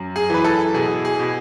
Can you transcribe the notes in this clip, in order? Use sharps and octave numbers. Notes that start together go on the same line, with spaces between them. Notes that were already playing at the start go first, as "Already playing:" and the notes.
Already playing: F#2
G#4
E3 B4
A4
B2 G#4
G#4
B2 G#4